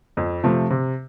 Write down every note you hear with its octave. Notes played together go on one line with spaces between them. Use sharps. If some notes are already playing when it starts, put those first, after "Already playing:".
F2
C3 F3 A3
C3